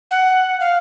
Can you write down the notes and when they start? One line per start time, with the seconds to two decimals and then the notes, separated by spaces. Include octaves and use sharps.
0.11 F#5
0.60 F5